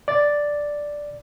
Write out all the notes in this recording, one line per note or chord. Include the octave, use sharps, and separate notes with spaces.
D5 A6